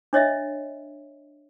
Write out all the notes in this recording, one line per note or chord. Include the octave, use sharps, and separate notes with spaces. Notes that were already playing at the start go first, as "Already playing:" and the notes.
D4 C#5 D#5 E5